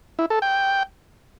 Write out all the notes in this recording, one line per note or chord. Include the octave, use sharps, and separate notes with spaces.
E4
A4
G5